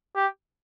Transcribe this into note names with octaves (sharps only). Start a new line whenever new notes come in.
G4